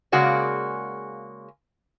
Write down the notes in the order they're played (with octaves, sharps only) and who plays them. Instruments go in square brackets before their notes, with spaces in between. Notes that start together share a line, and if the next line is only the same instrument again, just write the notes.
[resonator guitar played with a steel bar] C#3 G#3 A#3 F#4 G#4 D5